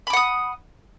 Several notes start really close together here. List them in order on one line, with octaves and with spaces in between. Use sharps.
B5 D6 F#5 D#6